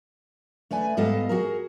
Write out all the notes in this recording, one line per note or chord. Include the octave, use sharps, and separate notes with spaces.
A3 B4 D5 G#5
G#2 G3 B3 A4 D#5 F5
F#4 G#4 A#4